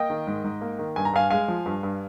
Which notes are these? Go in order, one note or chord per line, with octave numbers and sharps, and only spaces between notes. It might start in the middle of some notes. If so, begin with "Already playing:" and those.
Already playing: A#3 D#5 G5
D#3
G#2
G#2
A#3
D#3
G2 G#5
A#5
G2 F5 G#5
G#3 F5 G#5
F3
G2
G2